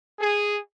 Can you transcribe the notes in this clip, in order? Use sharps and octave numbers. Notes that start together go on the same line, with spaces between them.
G#4